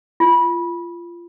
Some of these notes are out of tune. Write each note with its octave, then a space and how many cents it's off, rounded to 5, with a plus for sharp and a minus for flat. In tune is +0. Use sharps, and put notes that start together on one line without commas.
F4 -20